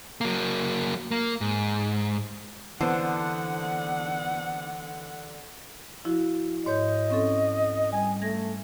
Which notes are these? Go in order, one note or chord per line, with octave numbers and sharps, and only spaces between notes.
F#3 A#3
A#3
G#2
D3 E3 B3 C4 C5 F#5 A5
F3 E4 F#4
G#2 C#5 D#5 G6
C4 C#4 A4
G3 G#5
A3 G#6 A#6